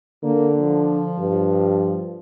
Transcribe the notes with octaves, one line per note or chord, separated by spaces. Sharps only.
D3 A#3
F3
G2